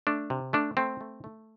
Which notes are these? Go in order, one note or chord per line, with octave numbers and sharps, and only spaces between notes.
A3 D4
C3
A3 D4
A3 C4
A3
A3